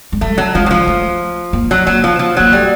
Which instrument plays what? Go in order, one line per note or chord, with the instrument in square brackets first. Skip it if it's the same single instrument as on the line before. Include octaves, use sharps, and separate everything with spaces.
[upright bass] G#3
[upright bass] G3 [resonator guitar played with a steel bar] A3
[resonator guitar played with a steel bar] F#3
[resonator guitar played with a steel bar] F3 [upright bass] G#3
[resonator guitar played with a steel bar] F#3
F3
[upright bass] A3
A#3
[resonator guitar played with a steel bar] F#3
[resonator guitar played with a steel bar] F#3 [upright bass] A#3
[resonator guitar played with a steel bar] F3
F3
[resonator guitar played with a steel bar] F#3 [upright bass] A#3
[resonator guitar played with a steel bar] G3 [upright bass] A3